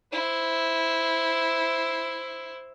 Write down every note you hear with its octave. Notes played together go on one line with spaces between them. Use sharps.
E4 C5